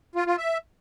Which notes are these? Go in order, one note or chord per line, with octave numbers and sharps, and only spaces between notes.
F4
F4
E5